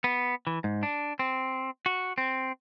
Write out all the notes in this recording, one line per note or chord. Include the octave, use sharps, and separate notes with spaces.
B3
E3
G#2
D4
C4
F#4
C4